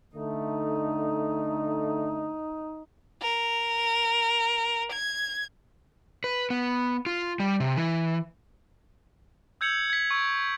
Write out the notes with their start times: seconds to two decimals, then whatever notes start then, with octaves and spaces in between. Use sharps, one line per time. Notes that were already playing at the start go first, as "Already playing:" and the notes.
0.15 D3 A3 D#4
3.22 A#4
4.92 G#6
6.24 B4
6.50 B3
7.06 F4
7.40 G3
7.60 C3
7.76 E3
9.61 E6 G6 G#6 C#7 F7 F#7
9.90 G#6 B6
10.11 C#6 E6 C#7 D7